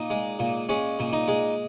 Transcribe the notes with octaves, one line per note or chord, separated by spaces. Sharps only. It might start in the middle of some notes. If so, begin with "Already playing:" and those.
Already playing: A#2 D#4
G#3
A#2
G#3 C#4
A#2
D#4
G#3